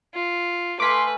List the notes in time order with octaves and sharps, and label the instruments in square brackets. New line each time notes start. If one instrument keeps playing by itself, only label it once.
[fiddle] F4
[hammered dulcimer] A3 F5 G#5 [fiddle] B4 [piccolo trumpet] C6 [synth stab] D6 B6